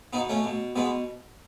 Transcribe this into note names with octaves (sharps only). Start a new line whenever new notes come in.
B2 B3 D#4
A3 C#4
B2
B2 G#3 B3